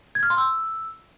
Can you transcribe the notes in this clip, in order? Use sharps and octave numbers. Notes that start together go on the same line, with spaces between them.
G#6
F6
C6
E6